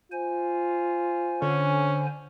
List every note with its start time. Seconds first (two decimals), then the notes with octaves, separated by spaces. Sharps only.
0.12 F4 C5 G#5
1.42 D3 C#4